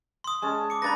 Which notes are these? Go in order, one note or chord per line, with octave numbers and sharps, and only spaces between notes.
C6 D#6
G#3 C#4 A5
D6 C#7
A#3 D4 B4 B5 A6 A#6